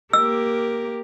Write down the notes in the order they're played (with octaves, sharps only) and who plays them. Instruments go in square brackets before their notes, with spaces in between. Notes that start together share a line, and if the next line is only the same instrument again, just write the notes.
[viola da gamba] A#3 G4 A#4 [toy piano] E6